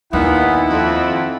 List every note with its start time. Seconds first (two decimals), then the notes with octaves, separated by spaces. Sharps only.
0.13 D#2 A#2 B3 D#4 E4 F#5
0.69 F2